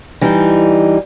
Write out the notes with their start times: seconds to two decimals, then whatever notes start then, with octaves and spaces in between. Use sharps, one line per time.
0.21 E3 G3 D#4